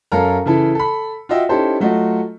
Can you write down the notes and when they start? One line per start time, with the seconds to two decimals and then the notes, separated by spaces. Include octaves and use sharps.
0.12 F#2 C#4 A4 A#4 F5 A#5
0.46 C#3 E3 E4 A4
0.75 A4 B5
1.29 F4 F#4 D#5 E5 G5
1.49 C#4 D#4 E4 G4 A4 C5
1.80 F#3 A3 F4 F#4 D#5